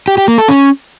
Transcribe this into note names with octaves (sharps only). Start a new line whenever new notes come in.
G4
G4
A#3
A4
C#4